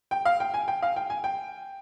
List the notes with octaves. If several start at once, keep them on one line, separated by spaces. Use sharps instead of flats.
G5
F5
G5
G#5
G5
F5
G5
G#5
G5